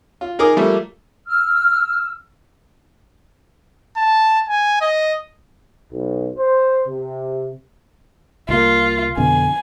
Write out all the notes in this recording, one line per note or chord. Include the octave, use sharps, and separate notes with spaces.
F4
D#4 G#4 A#4 D6 D#6
F3 G3 A3 A#3
E6 F6
A5
G#5
D#5
B1
C5
C3
C2 A#3 F4
F2 B2 D3 G#5